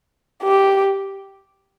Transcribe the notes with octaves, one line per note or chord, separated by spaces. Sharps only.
G4